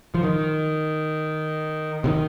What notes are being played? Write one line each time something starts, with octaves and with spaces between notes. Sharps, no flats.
F3
D#3
C3
D#3